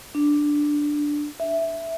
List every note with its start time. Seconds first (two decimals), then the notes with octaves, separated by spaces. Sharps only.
0.15 D4
1.40 E5